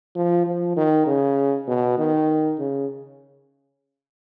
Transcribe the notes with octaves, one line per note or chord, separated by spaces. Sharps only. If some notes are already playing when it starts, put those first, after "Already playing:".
F3
F3
D#3
C#3
B2
D#3
C#3